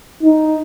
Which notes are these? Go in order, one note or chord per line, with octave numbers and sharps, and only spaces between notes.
D#4